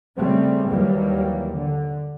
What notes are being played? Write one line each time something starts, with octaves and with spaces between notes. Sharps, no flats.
C#3 G3 A3 C4
D#2 E3 F#3 G3 A#3
D3